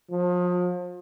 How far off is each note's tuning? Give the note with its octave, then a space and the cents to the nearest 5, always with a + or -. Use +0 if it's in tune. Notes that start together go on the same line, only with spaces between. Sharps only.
F3 +35